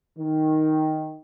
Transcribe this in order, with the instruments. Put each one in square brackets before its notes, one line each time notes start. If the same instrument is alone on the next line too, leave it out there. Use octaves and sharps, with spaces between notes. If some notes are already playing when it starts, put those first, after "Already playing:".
[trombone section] D#3